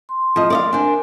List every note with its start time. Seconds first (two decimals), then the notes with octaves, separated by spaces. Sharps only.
0.09 C6
0.36 F3 D#5
0.50 D5 D#5 F5
0.73 D4 A#4 C5 G#5